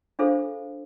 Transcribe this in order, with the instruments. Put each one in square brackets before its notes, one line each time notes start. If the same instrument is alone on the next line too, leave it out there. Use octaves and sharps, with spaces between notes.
[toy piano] D4 F4 G#4 A4 C5 F5